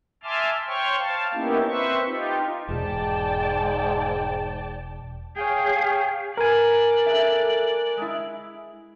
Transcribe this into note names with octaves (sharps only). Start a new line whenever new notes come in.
E5 G#5 A5 C6 D6 F6
C5 C#5 G5 C#6 F6
F5 A5
A#3 B3 C#4 D#4 E4 G4
C4 B4 C5 E5 C#6
D#4 F4 G4
E1 G#2 D5 G5 A5
G#4 C#5 F5 G5
A#4 B4 D5 G#5 F#6
A4 E5
G#3 E4